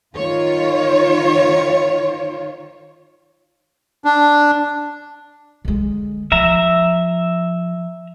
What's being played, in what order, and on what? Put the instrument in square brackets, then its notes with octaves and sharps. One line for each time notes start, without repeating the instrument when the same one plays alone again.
[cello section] D#3 F4 C#5
[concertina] D4
[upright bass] D3 G#3
[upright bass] F3 [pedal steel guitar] E5 A#5